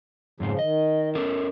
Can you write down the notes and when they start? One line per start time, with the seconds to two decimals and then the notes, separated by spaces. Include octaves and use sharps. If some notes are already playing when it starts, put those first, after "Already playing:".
0.40 F2 G#2 C#3 F3 C4
0.59 D#3 D#5
1.15 C#4 A4 A#4